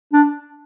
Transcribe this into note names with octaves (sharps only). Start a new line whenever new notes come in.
D4